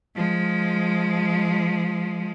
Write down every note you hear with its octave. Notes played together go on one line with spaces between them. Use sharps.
F3 G#3